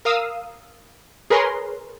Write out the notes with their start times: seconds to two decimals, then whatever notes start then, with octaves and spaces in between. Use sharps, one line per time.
0.05 A#4 F5 D#6 E6
1.30 G#4 A#4 B4 C#5 A#5 C6